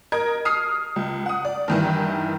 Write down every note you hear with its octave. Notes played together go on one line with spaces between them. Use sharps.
A#4 D#5 G#6
D#6 F6 C7
C#2
F#5 D#6
D5
G2 D#3 E3